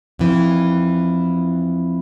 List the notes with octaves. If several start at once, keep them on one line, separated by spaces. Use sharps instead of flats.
F2 E3